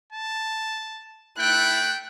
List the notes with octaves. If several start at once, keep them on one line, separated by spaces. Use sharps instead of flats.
A5
A3 E4 G5 F#6